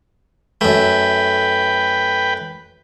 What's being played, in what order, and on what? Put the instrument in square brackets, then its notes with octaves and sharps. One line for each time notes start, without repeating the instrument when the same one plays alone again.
[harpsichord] F#2 A3 [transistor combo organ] B4 G5